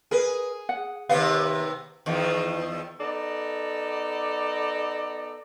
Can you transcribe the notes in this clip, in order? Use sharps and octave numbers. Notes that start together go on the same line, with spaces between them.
G#4 A#4 B4
F#5
D#2 C3 B3 F5
E2 D#3 F3
B3 D#4 A4 D5